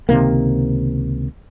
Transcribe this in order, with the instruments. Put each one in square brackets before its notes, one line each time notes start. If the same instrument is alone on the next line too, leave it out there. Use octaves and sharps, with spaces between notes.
[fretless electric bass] C#2 C3 D#3 A#3